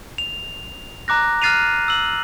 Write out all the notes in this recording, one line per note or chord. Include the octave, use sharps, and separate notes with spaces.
F7
A#5 D6 F#6 A#6
F6 F#6 A6 C7 D#7 F7
E6 F#7